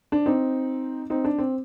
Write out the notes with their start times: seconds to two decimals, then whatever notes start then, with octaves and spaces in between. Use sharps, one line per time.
0.12 D4
0.26 C4 D#4
1.10 C4 D#4
1.25 D4
1.38 C4